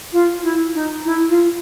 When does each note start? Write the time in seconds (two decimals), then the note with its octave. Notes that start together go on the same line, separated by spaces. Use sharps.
0.12 F4
0.42 E4
0.74 D#4
1.04 E4
1.28 F4